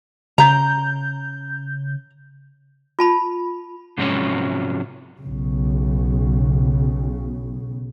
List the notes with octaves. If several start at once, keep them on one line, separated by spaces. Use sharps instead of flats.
C#3 A#5 G6
F4 A5 B5
G#2 C3 F3 F#3 G#3 C#4
B1 C#3